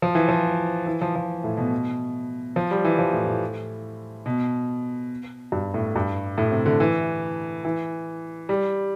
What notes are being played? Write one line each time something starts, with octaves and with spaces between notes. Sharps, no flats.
F3
E3
F3
E3
F3
F3
A2
B2
F3
G3
E3
F3
A2
A2
B2
G2
A2
G2
A2
C3
D3
E3
E3
G3